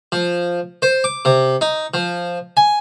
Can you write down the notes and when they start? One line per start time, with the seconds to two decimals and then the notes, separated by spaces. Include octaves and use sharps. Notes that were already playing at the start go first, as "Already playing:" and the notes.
0.12 F3
0.82 C5
1.04 D6
1.25 C3
1.61 D#4
1.94 F3
2.57 G#5